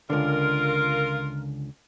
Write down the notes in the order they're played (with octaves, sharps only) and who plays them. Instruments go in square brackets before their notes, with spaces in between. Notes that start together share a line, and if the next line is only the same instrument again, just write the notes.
[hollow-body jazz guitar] C#2 D3 [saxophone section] F4 A#4